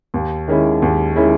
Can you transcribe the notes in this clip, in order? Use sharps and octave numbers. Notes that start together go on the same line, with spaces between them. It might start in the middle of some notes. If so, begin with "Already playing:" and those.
D#2
D#3 G#3 C#4 E4
D#2
D#3 G#3 C#4 E4